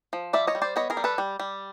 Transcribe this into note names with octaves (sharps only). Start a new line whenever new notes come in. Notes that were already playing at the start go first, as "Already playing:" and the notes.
F3
G3 D5 E5
C#5 D#5
G3
C5 D5
B3 C#5 D#5
G#4 A#4
G3
A4 B4
G3
G3